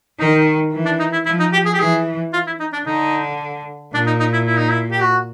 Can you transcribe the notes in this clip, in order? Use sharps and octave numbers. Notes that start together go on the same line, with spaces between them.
D#3 D#4
E3
D4
D#4
E4
F3 E4
D#4
G4
G#4
G4
E3 G#4
F4
E4
D#4
D4
D3 D#4
A#2 D4
D#4
D#4
E4
E4
D#4
E4
G4
F#4